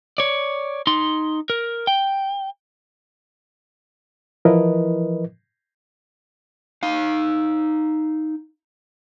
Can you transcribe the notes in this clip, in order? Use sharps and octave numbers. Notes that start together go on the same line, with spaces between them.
C#5 D5
D#4 C6
A#4
G5
E3 F3 E4 A#4 B4 D#5
D#4 F5